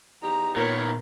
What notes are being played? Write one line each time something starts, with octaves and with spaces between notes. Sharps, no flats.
E2 D#4 G4 A#5
A#2 D#3 A#3 B3 A#4 C#5 A#5